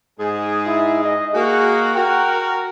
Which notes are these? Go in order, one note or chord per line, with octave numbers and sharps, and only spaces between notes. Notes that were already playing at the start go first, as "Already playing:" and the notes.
G#2 G#4
E4
D#5
A#3 F#4 G#4
F#4 A#4 G5